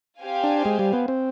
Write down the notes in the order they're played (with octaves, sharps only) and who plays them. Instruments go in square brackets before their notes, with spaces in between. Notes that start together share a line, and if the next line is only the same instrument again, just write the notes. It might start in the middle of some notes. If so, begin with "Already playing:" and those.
[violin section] C4 G4 C5 F5 G#5
[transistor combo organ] D4
G#3
G3
B3
C4